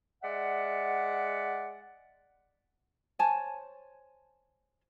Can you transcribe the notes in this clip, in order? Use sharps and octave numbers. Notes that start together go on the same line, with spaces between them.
G#3 D5 E5 F#5
C5 C#5 G#5 A5